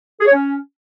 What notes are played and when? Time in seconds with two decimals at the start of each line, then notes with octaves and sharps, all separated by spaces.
0.20 G#4
0.26 C#5
0.32 C#4